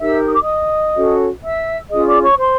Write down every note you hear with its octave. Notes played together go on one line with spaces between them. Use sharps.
D#4 G4 A#4 E5 E6
D#6
D6
D#5 D#6
C#4 F#4 A4 C#5
E5 E6
C#4 F4 G#4 D#5 D#6
D5 D6
C#5 C#6
C5 C6